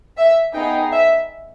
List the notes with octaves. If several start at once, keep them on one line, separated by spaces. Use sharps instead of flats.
E5
B3 D#4 G#4 G5
E5